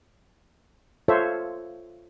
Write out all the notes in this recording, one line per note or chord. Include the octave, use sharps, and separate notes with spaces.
F4 A4 C5 C#5 E5